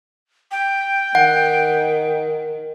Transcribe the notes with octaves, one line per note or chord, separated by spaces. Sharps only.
G5
D#3 F#5